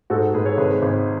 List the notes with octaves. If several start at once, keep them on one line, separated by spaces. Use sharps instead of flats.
G#2 F#4 A4
G#2 G#4 B4
A4 C#5
G#1 G#4 B4
G#1